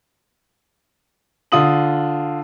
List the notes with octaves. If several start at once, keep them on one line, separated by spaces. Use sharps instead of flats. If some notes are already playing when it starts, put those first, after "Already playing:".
D3 F4 D#6 F#7